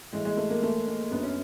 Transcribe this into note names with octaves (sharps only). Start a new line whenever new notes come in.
A2 E3 G#3
G#3
A3
A#3
A3
A#3
F#2 D3 B3
C#4